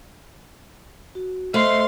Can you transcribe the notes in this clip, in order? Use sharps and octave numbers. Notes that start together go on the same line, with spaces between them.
F#4
A3 C5 D#5 F5 C6